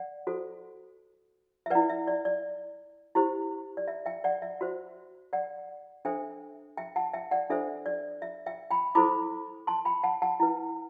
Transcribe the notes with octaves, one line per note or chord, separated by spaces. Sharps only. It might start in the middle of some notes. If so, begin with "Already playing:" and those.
Already playing: D5 F#5
F#4 A4 C5
E5
E4 B4 D5 F#5
E5
D5
D5
E4 G4 C5
D5
E5
E5 G5
D5 F#5
E5
F#4 C5
D5 F#5
D4 A4 C5 E5 G5
E5 G5
F#5 A5
E5 G5
D5 F#5
D4 A4 C5 E5
D5
E5
E5 G5
G5 B5
E4 A4 C5 B5 D6
A5 C6
G5 B5
F#5 A5
F#5 A5
E4 B4